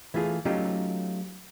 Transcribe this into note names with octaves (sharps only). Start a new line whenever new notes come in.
E3 A3 F4 G#4
F#3 A3 C#4 D#4 F4 G4